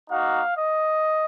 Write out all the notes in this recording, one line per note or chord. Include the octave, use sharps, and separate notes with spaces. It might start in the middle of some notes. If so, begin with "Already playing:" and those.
A#3 D#4 F#4 F5
D#5